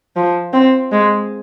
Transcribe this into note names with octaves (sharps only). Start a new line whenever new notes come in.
F3
C4
G#3